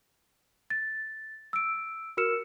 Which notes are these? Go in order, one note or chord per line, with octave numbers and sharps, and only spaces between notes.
A6
E6 D7
F#4 A#4 E6 F6 C#7 E7